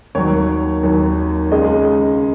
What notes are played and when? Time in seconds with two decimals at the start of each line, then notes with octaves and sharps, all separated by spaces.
0.15 D#2 D#3 F#3 C#5
0.83 D#2 D#3 F#3
1.52 C#2 C#3 G#3 D#5